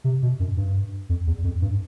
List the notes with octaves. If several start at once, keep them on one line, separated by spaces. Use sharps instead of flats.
C3
B2
F#2
G2
F2
E2
F2
G2